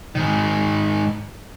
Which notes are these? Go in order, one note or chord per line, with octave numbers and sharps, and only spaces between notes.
G#2 D#3